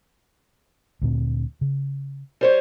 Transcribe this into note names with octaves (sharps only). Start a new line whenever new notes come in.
D2 A#2 C4
C#3
G3 C5 C#5